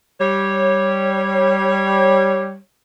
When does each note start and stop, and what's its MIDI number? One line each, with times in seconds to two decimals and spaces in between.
0.20 2.59 55
0.20 2.59 73